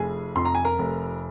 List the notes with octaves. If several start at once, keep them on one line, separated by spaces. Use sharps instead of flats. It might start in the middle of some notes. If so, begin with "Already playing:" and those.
Already playing: F1 F2 G#4 G#5
F2 C6
A#5
G#5
A#4 A#5
F1